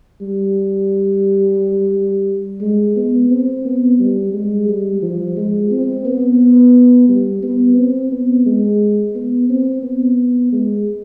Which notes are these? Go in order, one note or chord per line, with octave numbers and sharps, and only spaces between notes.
G3
G#3
B3
C4
B3
G3
G#3
G3
F3
G#3
C4
B3
G3
B3
C4
B3
G#3
B3
C4
B3
G#3